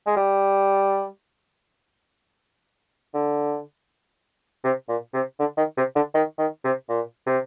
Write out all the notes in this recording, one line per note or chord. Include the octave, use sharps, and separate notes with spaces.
G#3
G3
D3
C3
A#2
C3
D3
D#3
C3
D3
D#3
D#3
C3
A#2
C3